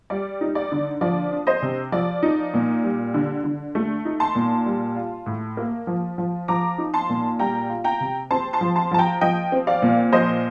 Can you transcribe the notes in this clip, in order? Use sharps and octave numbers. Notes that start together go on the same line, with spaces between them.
G3 D5
D#4
D5
D3
F3 D5
D4
C5 D#5
C3
F3 D5
D#4
A#2
G3
D3
D3
A3
D#4
A5 C6
A#2
G3
F4
A2
A#3
F3
F3
F3 A#5 D6
D#4
A5 C6
A#2
G3 G5 A#5
F4
G5 A#5
C3
C4 A5 C6
A5 C6
F3
A5 C6
F3 A5
G5 A#5
F3 D#5 G5
C4
D5 F5
A#2
F3 C5 D#5